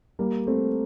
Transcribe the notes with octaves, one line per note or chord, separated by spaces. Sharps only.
G3 A#3
A3 C4